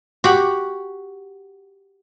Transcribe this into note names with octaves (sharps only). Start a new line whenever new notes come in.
F#4 G4 F#5